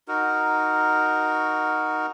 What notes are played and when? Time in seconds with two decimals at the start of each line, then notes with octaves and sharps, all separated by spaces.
0.08 D#4 F#4 A#4